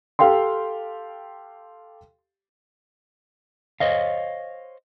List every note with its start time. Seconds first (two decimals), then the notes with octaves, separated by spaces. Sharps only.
0.19 G4 A4 F5 G5 C6
3.80 C5 C#5 D#5 F5